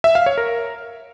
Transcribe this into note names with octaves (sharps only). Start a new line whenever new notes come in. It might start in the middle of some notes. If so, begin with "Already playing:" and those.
E5
F5
C#5
A#4